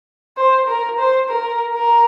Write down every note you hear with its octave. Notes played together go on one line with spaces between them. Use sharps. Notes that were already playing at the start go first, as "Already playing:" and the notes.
C5
A#4
C5
A#4
A#4